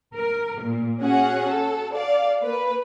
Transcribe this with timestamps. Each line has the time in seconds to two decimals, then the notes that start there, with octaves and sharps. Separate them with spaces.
0.14 A#4
0.63 A#2
1.01 C#4 F#4 G#4 F#5
1.50 A4
1.95 D5 F5
2.41 A#3 B4